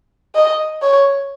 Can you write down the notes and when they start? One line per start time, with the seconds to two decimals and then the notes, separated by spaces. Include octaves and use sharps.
0.35 D#5
0.82 C#5